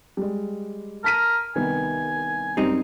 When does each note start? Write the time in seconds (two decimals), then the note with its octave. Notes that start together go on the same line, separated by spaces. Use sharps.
0.17 G3 G#3
1.04 A#4 A5 B6 D#7
1.56 C2 D#3 B3 G#5
2.57 F#2 G3 C4 D#4